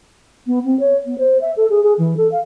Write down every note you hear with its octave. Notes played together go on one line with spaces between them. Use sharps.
B3
C4
C#5
B3
C5
E5
A4
G#4
G#4
E3
A4
F5